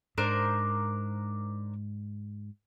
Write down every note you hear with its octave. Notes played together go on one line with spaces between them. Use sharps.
G#2 D4 A#4 C5